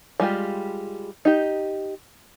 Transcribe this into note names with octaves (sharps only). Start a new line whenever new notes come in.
G3 G#3 F4 G4
D#4 G4